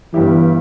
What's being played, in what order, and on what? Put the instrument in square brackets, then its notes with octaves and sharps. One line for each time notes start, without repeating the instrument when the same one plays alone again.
[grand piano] G1 G2 G3 E4 G4 [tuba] E3